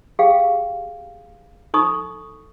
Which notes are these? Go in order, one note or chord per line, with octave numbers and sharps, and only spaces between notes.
G4 G#4 F5 G5
D#4 A4 B5 C#6 D#6